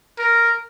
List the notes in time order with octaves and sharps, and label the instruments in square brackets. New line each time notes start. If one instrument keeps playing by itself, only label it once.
[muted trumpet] A#4